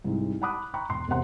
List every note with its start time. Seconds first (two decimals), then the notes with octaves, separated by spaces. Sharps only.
0.04 C2 G#2
0.42 F#5 A5 B5 D6 D#6 F#6
0.74 G5 A#5 B5 C#6
0.89 E1 C6
1.08 E1 C3 A#4 C5 F#5 C6